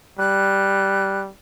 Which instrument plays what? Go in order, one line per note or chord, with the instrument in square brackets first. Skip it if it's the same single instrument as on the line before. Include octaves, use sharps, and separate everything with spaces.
[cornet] G3 [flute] F#6